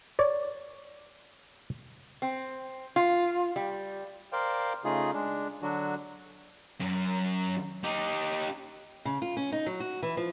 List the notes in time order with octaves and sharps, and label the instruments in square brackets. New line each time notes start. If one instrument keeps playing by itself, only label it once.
[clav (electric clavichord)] C#5 D5
[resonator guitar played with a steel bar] C4
F4
G3
[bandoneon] A#4 C5 D5 F5 G5
C#3 A3 D#4 F4 G#4
G#3 D4
D3 F#3 D4 F#4
[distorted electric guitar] F#2
D#4 G4
[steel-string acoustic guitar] C#3
F4
C#4
D#4
F#3
F#4
E3
F3